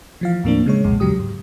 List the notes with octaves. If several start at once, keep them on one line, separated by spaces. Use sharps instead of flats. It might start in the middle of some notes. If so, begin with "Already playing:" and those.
E3 F3 F5
D#2 A2 F3 A#3 C4 D4
C#3 G#3 C#5
B1 F2 A#2 G#3
D#2 C#3 F#3 G#3 G4 D#6
G#2